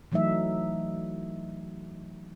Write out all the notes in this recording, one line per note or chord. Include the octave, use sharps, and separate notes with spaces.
E3 F#3 A3 D#4 E5